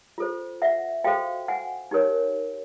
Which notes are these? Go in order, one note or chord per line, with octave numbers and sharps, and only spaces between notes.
F4 A4 C5
E5 F#5
F#4 A4 C5 F5 G5
F#5 G#5
D#4 G4 A#4 C#5